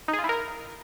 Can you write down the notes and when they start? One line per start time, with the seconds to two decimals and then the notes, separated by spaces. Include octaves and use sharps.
0.08 D#4
0.13 G#4
0.19 F4
0.24 E4
0.29 A#4